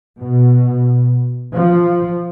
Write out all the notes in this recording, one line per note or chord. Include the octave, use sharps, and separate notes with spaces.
B2
F3